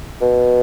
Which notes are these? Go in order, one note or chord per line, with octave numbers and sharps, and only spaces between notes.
B2